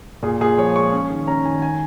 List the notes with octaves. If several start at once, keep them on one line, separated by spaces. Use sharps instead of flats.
A#2 G#4
A#2 G#4
F3 C#5
G#3 C#6
C#4
D#3
C#4 A#5
D#3 G#5
G#5